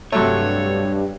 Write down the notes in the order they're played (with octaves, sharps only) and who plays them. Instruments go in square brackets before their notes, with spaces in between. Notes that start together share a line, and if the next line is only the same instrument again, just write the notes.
[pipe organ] G2 [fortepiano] C3 F#3 A3 [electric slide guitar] C#5